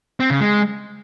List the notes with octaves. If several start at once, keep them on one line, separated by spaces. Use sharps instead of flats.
C4
C#3
G#3